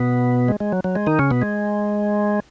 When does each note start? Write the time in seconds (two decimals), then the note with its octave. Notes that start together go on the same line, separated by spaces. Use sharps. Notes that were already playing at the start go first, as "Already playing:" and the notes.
Already playing: B2 B3
0.48 G#3
0.60 G#3
0.72 F#3
0.84 F#3
0.95 G#3
1.07 D#3 D#4
1.19 C#3 C#4
1.31 B2 B3
1.42 G#3